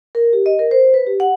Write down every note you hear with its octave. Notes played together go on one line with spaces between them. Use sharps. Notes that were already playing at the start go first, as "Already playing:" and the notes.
A#4
G4
D#5
A#4
C5
B4
G4
F#5